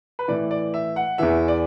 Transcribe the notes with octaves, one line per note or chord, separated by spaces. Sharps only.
B4
A2 E3 D5
D5
E5
F#5
E2 E3 E5
D5